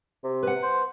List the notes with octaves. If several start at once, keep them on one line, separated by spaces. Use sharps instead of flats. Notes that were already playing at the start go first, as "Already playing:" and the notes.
C3
B4 F#5
C5